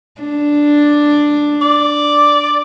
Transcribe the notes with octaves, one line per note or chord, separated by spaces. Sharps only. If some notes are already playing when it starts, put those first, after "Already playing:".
D4
D5